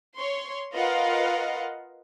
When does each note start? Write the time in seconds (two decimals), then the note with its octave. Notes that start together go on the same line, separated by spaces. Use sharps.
0.16 C#5 C6
0.74 F4 A#4 B4 D#5 F5 F#5